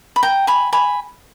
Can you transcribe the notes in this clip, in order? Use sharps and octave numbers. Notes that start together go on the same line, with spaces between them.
B5
G5 A#5
G#5 B5
G#5 B5